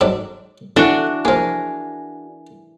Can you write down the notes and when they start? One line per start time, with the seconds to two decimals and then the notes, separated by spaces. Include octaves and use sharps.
0.01 G#2 F#3 D4
0.76 D3 E3 D4 F#4 F#5
1.25 F3 A#3 G#4 A#4